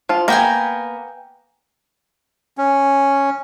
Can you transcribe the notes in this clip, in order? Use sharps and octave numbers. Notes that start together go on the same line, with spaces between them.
F3 F4
A#3 B3 A#4 G5 G#5
C#4